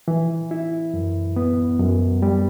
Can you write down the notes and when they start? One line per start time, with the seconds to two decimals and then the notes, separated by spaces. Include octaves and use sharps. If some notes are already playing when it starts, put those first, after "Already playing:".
0.08 E3
0.51 E4
0.94 F#2
1.36 B3
1.79 F#2
2.22 G3